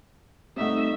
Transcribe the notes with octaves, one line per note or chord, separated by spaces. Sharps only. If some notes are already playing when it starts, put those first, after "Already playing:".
G3 A3 C4 D#4 F#4 E5